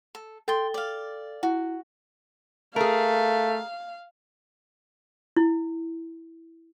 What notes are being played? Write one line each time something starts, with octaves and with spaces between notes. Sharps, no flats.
A4
A4 G5 C6 A6 G7
D5 F5
E4 F#4
A3 G#4 A#4 F5
E4